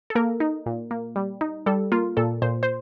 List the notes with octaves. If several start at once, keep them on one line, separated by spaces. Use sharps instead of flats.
A4
A#3 A#4
D#4
A#2
A#3
G3
D#4
G3 A4
A#3 F4
A#2 A4
A#2 C5
C5